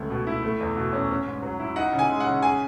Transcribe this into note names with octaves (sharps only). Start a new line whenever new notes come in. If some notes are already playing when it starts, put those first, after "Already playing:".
Already playing: C#2 A3
B2
E4
A3
E2
B2
C#4
C#4
G#2
F#3
E4
D#4 F#5
C#3
G#5
G#3
F#5
C#3
G#4 G#5